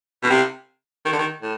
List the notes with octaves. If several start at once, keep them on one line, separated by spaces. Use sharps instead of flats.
B2
C3
D#3
D3
D#3
A2